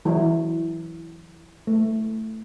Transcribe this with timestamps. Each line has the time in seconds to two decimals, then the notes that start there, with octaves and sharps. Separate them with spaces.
0.05 E3 F#3 E4
1.67 A3